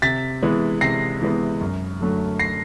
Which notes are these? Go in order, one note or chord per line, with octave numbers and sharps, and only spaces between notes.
C3 A6 B6
E3 G#3 B3
C3 A#6 C7
E3 G#3 B3
F#2
D3 F#3 A3
A#6 C7